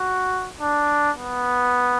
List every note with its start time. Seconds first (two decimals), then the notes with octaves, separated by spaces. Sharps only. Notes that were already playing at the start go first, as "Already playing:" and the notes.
Already playing: F#4
0.61 D4
1.16 B3